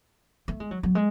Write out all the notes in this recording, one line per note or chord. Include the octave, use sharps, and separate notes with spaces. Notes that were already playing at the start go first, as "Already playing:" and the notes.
A3
G#3
F#3
F#3
G#3